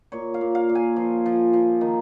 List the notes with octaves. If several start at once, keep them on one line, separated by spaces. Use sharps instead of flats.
A#2 C#5
F5
A#2
F5
A#2
G#5
F3
F3
F3
D#3